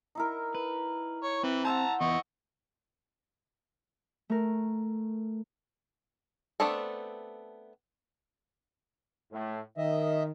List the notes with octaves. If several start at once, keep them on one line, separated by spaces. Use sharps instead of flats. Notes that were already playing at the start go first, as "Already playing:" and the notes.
D#4 E4 A#4
B4
C#5
E3 C4
C5 E5 F#5 A5 A#5
E2 D#5 C#6
A3 A#4
A3 B3 C4 D4 A4
A2
D#3 D#5 E5